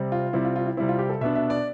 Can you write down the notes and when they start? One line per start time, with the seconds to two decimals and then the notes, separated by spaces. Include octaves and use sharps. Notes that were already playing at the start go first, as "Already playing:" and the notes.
Already playing: C3 G3 C4
0.12 F4
0.33 C3 G3 C4 E4
0.45 F4
0.56 F4
0.66 E4
0.77 C3 G3 C4 E4
0.89 F4
0.99 G4
1.09 A4
1.21 B2 B3 D4 E5
1.35 E5
1.50 D5